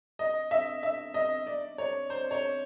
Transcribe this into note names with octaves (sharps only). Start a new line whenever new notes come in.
D#5
E5
E5
D#5
D5
C#5
C5
C#5